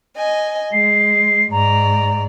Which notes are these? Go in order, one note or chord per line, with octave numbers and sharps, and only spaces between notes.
D#5 G#5
G#3 C7
G#2 D5 A#5